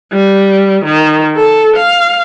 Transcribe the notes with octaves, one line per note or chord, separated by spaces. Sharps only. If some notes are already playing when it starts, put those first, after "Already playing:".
G3
D#3
A4
F5